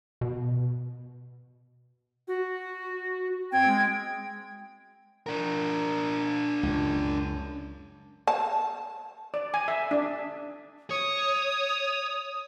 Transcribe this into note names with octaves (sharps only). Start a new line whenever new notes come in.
B2
F#4
C4 G5 G#6
G#3
D4 A#4
C#2 F#2
A5
D5
G#5
E5
D4
C#5 D#6